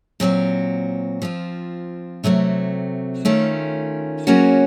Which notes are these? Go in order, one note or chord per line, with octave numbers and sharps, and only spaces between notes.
A#2 F#3 C4 F#4
F3 C4 F4
C3 F#3 A3 C4
D#3 A3 C#4 F4
C#3 F#3 A#3 C#4 F#4